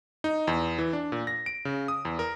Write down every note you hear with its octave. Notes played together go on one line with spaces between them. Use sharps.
D#4
E2
E3
D4
A#2
A#6
D7
C#3
D#6
E2
A#4